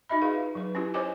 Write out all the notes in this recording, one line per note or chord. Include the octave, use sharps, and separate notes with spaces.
D#4 F#4 D#5 E5 B5
F4 G#4 B4 F5
F#3 B4
C#4 E4 F4 G4
C5 C#5 D#5 G#5 D6